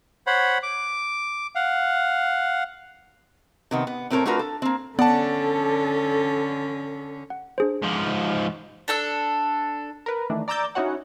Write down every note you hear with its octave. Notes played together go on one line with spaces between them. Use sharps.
C5 C#5 F#5 B5
D6
F5 F#5
C3 D#3 B3
B3
A2 C4 A4 A#4 C#5
A3 D4 F4 F#4 A#4 B4
A4
A#3 C4
D3 B3 C#4 A4 D5 F#5 A5
F#5
D4 G#4 C5
G#2 F3
D4 A4 E6
A#4 B4
D#3 E3 A3 D4
D5 A#5 D6 E6 G6 A6
C#4 D#4 E4 F#4 C#5 F#5